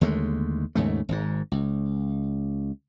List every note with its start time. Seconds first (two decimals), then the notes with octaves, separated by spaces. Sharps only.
0.01 D#2 D3 G#3 A3
0.75 D#2 G#2 C#3 A3
1.09 G#1 G#2
1.52 C#2